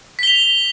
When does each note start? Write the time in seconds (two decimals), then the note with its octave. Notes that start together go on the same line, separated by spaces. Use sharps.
0.19 B6
0.23 G7
0.27 F7